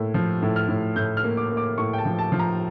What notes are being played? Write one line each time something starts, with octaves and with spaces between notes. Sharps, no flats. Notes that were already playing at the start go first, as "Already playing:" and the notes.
Already playing: A2 A#3
F3
A2
F6
A2
A2 G6
F6
A#3
D6
A#3
D6
A2 C#6
G5
A5
F3
A5
F3
A#5